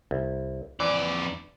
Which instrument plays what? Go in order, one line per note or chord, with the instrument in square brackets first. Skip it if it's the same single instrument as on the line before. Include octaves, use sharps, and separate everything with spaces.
[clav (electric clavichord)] C2
[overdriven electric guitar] F2 D5 [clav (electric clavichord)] E3 C5 G#5